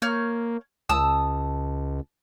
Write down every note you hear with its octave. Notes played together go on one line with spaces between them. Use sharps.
A#3 C#5 F6 G6
C#2 A5 D#6 E6